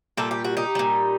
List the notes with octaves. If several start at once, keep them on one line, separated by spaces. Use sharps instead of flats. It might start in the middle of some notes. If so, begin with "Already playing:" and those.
A#2 G3 A4
G4
F#4
D#4 G4
A#2 G3